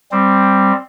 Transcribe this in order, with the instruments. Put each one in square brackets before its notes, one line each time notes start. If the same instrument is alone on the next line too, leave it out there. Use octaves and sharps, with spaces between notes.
[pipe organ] G3 C4